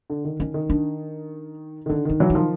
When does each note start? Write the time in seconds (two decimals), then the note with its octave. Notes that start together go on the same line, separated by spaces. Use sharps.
0.10 D3
0.25 D#3
0.40 D#3 C#4
0.54 D#3
0.70 D4
1.86 D#3
1.89 D3 D4
2.05 D#3 D#4
2.20 E3 F#3
2.30 D#4
2.35 D#3 F3